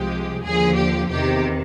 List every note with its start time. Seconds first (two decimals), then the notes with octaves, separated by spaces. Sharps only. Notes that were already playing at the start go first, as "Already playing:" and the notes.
Already playing: C2 C3 F3 G#3 G4
0.45 D#2 D3 F3 G#4
0.77 G4
1.11 E2 C3 D#3 G4